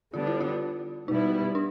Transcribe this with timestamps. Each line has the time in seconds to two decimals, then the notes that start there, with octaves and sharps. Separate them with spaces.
0.14 D3 G3 B3 D4 F4
0.27 E4
0.41 F4
1.08 B2 G3 B3 D#4 E4
1.55 D4